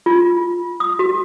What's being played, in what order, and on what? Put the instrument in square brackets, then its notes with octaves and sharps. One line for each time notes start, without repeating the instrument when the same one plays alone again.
[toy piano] F4
D#6
F#4